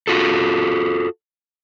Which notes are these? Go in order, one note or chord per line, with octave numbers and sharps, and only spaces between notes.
F4 F#4 A4